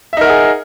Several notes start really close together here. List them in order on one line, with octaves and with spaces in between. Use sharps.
E5 D#4 A#4 F#5 G#4